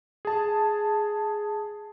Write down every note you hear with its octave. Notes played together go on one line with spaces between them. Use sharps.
G#4 A5